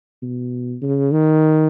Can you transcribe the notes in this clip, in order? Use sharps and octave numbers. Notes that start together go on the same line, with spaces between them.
B2
C#3
D#3